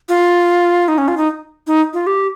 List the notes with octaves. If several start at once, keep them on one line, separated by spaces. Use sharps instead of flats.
F4
D#4
C#4
F4
D#4
D#4
F4
G4